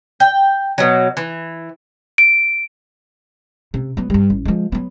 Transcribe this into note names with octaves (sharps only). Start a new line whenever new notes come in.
G5
B2 F#3
E3
D7
C3
F#3 B3
G2 G3
A1
F3 G#3
F#3 B3